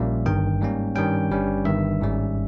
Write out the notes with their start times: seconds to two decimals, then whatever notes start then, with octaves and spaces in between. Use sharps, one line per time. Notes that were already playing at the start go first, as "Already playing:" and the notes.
Already playing: A#1 A#2 G3 A#3 C#4 E5
0.26 G1 G2 D#3 G5
0.61 G#2 G3 A#3 C#4
0.95 G2 D#3 G3 C#4 G5
1.30 G1 G2 G3 C#4
1.65 G1 G2 D#3 E5
2.01 G#1 G#2 G3 C#4